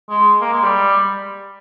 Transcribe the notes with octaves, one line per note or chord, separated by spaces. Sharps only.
G#3
A#3
G#3
G3